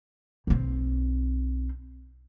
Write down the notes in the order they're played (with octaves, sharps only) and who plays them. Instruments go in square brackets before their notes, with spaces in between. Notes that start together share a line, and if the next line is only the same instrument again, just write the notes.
[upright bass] B1 C4